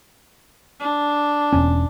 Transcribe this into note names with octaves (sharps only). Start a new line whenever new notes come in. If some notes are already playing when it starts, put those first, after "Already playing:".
D4
E1 C#4